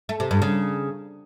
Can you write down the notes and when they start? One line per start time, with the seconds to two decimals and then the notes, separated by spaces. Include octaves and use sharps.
0.09 A3
0.20 C3
0.31 G2
0.42 C#3